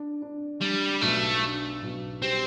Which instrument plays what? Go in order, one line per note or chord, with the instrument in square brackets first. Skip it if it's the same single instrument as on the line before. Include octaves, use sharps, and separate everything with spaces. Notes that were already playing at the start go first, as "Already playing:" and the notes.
Already playing: [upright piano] D4
D4
[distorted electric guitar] G3 [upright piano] D4
[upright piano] B1 [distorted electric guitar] A3
[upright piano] D4
B1
[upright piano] G3 [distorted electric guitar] C4